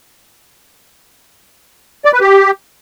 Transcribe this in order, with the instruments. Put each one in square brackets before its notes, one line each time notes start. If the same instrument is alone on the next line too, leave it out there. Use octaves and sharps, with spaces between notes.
[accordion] D5
B4
G4